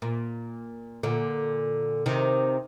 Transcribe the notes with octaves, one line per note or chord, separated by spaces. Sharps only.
A#2
A#2 D3
C3 D#3